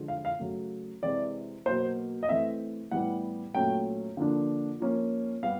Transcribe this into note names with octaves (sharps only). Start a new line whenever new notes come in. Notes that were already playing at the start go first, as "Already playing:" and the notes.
Already playing: D3 F3 G#3
F5
F5
C#3 F#3 A3
C3 E3 G#3 C4 D5
B2 F#3 A#3 C5
D#5
E3 A3 C4 E5
A2 E3 G3 B3 F#5
A#2 F#3 A3 C#4 G5
D3 F3 A#3 D4
F3 A#3 C#4
G3 B3 F5